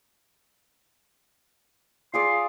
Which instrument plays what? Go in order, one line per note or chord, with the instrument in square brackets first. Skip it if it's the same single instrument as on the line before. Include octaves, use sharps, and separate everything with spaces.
[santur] F4 G#4 D5 [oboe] C6